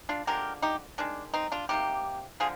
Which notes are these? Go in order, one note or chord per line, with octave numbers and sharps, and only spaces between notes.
D4 F4
D3 F3 G#3 G4 A#4
D#4 G4
D#3 G#3 D4
C4 D#4
D4 F4
C3 G3 A#3 D#4 G4
D3 F3 F4 G#4